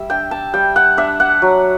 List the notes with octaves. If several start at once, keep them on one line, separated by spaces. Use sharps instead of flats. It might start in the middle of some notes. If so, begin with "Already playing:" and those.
Already playing: G3 E5
D4 G5
A5
G3 G5
F#5
D4 E5
F#5
F#3